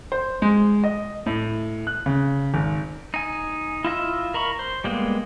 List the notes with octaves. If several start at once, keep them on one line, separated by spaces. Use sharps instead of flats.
C5
G#3
D#5
A2
F#6
C#3
G#1
D#4 G#5
E4 F4 D#5 E5
A#4 A#5 B5 C#6
C5
G3 G#3 A#3 B3